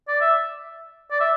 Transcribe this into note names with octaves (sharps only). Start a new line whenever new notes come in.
D5
E5
D5
E5